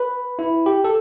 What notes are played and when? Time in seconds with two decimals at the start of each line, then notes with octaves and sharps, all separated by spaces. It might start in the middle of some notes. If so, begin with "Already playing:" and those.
Already playing: B4
0.39 E4
0.66 G4
0.84 A4